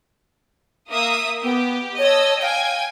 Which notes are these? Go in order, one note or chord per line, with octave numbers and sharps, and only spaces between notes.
A#3 E5 D#6
B3 G4
C#5 D#5 A5 E6
F5 G5 G#5 G#6